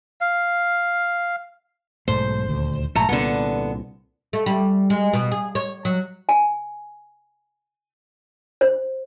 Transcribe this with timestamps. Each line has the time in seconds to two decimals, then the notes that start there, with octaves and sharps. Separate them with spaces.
0.21 F5
2.08 B1 G#2 A3 C5
2.46 D#1 D2
2.95 A#1 G#2 A3 A#5
3.09 C2 A#2 D3 B3
4.33 A3
4.46 G3
4.90 G#3
5.13 B2
5.32 G#4
5.55 C#5
5.85 F#3
6.29 G#5
8.61 C5